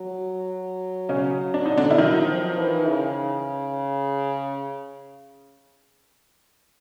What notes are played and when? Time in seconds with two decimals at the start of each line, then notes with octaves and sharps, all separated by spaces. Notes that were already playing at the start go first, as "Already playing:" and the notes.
Already playing: F#3
1.09 C#3 C#4
1.54 D4
1.66 D#4
1.77 D3 D4
1.90 E4
1.98 D#3 F#3 D#4
2.28 F3
2.57 E3
2.87 C#3